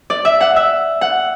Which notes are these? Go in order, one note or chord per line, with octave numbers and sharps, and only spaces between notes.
D5
E5
F#5
E5
F#5